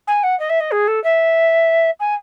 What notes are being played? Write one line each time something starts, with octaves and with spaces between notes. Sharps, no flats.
G#5
F#5
D#5
E5
D#5
G#4
A4
E5
G#5